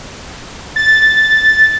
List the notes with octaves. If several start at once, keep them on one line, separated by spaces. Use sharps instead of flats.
A6